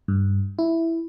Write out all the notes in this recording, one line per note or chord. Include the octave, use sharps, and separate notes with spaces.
G2
E4